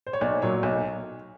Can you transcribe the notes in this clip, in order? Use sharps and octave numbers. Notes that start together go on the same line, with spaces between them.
C5
C#5
B1 D5
A#2 F#3 C#5
B1